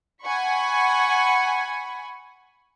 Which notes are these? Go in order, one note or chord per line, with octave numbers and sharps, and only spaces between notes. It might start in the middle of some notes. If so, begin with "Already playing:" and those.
F#5 G#5 B5 C#6